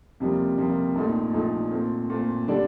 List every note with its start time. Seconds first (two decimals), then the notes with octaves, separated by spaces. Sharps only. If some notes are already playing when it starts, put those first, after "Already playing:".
0.20 F2 C3 G3 A#3
0.58 F2 C3 G3 A#3
0.96 A#1 A#2 A3 D#4
1.33 A#1 A#2 A3 D#4
1.71 A#2 A3 C4
2.10 A#2 A3 C4
2.48 D3 G3 D4 A4 D5